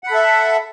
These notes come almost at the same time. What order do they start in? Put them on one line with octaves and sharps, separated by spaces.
F#5 B5 A4 E5